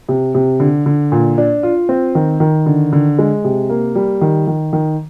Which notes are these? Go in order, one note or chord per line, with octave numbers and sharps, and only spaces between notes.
C3
C3
D3
D3
A#2
D4
F4
C4
D#3
D#3
D3
D3
G#3
C3
A#3
G3
D#3
D#3
D#3